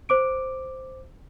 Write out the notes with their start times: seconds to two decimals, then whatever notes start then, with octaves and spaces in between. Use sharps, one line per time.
0.09 C5 D6 D7